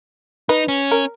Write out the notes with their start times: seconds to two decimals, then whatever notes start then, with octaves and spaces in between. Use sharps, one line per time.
0.49 D#4 B4
0.68 C#4
0.91 A#4